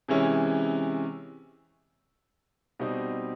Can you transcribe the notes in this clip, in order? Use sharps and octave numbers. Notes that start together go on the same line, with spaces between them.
C3 E3 G#3 C#4 E4
B2 G3 C4 D#4